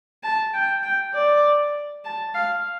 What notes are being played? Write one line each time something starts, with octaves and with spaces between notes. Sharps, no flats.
A5
G5
G5
D5
A5
F5